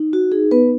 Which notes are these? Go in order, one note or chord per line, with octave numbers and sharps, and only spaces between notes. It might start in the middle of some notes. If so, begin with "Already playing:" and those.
Already playing: D#4
F#4
D#4 G#4
B3 B4